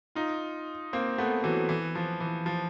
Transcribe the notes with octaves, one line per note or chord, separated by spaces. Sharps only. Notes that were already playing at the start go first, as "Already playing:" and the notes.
D#4 F4
A#3 C4
A3 B3
E3 F#3
E3
F3
E3
F3